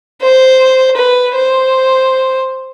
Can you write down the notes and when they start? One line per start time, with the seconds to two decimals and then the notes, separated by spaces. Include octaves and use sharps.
0.21 C5
0.97 B4
1.35 C5